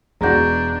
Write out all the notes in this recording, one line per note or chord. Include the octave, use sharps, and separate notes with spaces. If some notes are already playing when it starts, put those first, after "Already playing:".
E1 G#3 B3 D4 F#4 A#5 G6 A#6